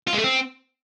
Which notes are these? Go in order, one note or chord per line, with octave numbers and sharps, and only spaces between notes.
F4
G#3
A3
C4